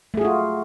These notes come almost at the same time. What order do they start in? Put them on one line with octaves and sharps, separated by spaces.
A3 G#4 F#4 F4